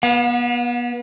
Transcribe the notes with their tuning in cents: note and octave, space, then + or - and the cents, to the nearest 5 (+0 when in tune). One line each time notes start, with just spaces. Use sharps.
B3 -30 F5 +45